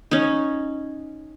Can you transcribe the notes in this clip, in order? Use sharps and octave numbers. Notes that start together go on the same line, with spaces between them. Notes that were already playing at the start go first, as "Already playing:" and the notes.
C#4 D#4